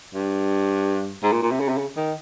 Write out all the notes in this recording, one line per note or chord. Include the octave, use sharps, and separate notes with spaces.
G2
G#2
A#2
A#2
C3
C#3
C3
C#3
D#3